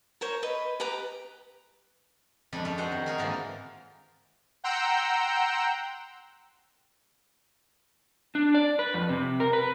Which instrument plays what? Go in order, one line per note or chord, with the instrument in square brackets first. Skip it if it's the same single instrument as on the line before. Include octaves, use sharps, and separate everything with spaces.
[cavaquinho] A#4 C5 C#5
B4 D#5
G4 B4 A#5 D#6
[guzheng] F2 G#3 D4 A4 B4 B5
G#3 C#4 D5 E5
D4 F#4 C5 E5 F#5 G5
D#3
F#4 G#4 A#4
G#2 D3 E3 A#3 C4 F4
[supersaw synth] F#5 G5 A#5 C6 E6 G6
[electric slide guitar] D4
D5
B4
F2
C3
A#4
B4